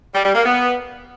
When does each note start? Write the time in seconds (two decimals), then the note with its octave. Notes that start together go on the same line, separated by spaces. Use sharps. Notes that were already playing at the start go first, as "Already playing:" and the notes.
0.14 G3
0.25 G3
0.35 A#3
0.45 B3